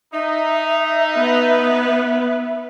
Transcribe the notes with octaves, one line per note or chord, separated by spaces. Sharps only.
D#4 E5
B3 B4